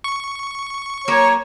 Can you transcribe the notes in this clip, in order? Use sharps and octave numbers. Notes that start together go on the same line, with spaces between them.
C#6
F#3 A#3 A#4 C#5